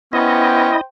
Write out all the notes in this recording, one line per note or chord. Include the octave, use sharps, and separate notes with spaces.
B3 C#4 E4 C5 D#5 G5